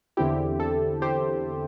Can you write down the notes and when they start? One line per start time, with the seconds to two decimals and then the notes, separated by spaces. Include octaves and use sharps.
0.17 E2 D3 C4 E4 G4
0.60 A4
1.02 G4 C5